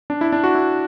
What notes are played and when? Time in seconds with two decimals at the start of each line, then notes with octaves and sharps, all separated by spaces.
0.10 D4
0.21 E4
0.32 D4
0.44 F#4
0.55 E4